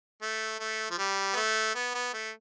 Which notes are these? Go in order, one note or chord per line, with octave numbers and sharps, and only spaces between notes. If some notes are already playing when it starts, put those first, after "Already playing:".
A3
A3
F3
G3
B3
A3
B3
B3
A3